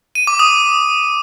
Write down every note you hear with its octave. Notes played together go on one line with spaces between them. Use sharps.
D#7
D6
D#6